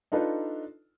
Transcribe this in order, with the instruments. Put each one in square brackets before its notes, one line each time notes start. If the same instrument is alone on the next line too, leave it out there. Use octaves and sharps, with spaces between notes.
[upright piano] D4 D#4 F4 A4 B4 D5